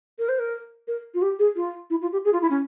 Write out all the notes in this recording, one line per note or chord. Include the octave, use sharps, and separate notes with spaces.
A#4
C5
A#4
A#4
F4
G4
G#4
F4
E4
F4
G4
G#4
F4
E4
C#4